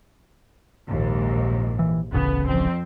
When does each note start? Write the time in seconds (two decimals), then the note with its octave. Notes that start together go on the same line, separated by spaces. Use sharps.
0.88 A#1 D#2 G#2
1.79 E3
2.12 D1 A1 C#3 B3
2.46 F2 C4